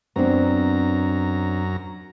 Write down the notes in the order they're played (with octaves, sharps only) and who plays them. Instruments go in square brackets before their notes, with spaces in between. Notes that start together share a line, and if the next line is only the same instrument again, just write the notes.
[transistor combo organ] F#2 A#5 [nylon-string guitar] B3 C4 D4